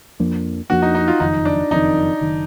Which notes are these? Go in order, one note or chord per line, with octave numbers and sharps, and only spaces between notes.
F2 F3 A#3 D4
F2 F3 A#3 D4 F#4
D#4
D#4
F4
F#1 F2 D#3 D#4
D4
F#1 F2 D#3 D#4
F#1 D#3